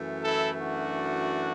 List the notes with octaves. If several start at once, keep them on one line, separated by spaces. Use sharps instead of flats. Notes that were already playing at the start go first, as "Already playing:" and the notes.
Already playing: F#2 E3 A3
E4 A4
D4 F#4